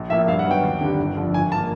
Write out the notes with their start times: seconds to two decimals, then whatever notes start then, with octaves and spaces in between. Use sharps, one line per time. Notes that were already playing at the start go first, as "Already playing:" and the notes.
Already playing: A#1
0.09 A2 F3 A#3 E5
0.28 G2 F5
0.39 F#5
0.46 D#3 F#3 B3 G5
0.63 D#2
0.81 D3 G3
0.99 G1
1.16 F2 D3 F3
1.34 G#1 G#5
1.52 F3 A#3 A5